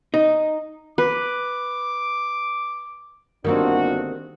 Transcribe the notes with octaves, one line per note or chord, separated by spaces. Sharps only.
D#4
B4 D6
G1 D#3 A#3 C4 D4 F#4